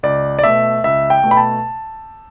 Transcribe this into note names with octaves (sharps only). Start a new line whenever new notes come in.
C#2 D5
D5
B2 A3 E5
C#2 E5
G5
B2 A3
B5
A5